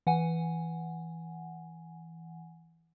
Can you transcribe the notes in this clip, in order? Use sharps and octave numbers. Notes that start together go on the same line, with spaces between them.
E3 F#5 G#5